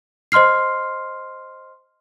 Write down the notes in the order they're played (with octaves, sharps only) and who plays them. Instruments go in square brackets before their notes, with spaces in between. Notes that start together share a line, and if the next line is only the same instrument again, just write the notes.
[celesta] C5 D#5 C6 F6 C7